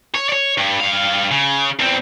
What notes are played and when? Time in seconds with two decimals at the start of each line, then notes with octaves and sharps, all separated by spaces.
0.15 C#5
0.29 C#5 D5
0.58 G2
0.80 G2 F5
1.31 C#3
1.79 E2 C4